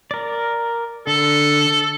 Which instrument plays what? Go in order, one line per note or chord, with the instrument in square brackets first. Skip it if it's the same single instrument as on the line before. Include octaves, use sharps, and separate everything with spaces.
[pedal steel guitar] A#4 D5
[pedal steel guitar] D3 [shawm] A4